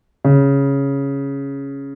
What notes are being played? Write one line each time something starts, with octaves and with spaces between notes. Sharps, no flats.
C#3